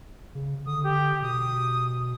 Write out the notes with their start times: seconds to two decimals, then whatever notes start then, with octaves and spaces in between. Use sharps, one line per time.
0.35 C#3
0.66 D3 D#6
0.84 G4
1.22 B2 D#6